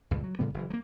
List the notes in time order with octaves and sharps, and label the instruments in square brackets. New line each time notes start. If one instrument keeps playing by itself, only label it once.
[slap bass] C#2 G2 A#2
F#3
A2 C#3 G3 B3
F#1 E3
F#3 A#3